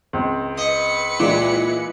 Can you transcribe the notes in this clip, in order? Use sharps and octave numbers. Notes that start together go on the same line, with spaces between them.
C#2 C4
B4 D#5 C#7
A#2 E3 G#3 E4